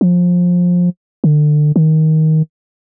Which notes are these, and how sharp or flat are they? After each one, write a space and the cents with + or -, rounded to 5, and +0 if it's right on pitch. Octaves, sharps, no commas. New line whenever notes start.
F3 +20
D3 +30
D#3 +15